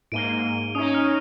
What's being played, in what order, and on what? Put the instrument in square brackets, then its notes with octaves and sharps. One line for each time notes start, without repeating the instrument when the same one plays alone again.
[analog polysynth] G#2 A#3 [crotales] D7 D#7 G7
[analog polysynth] C#4 D#4 [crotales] D#6
[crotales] F6